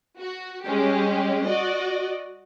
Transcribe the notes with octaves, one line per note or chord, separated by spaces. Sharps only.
F#4
G3 G#3 C#4 G4
F#4 D5 D#5